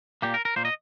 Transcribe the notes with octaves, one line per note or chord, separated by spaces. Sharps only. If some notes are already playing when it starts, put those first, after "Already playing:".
A#2 A#3 G4
A#4
A#4
A#2 A#3 C5
D#5